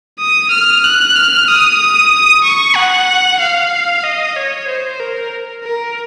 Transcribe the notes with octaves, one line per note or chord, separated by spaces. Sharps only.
D#6
F6
F#6
F6
D#6
C#6
F#5
F5
D#5
C#5
C5
A#4
A#4